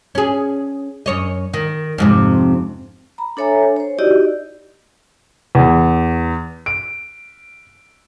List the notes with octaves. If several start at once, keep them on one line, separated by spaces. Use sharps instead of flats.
C#4 G#4
F#2 C#5 D#5
D#3
F2 G#2 C3
A#5 B5
D4 A4 C#5 E5 G#5 A#5
C5 C#5
D#4 E4 F#4 G4 D5 D#5
E2
D7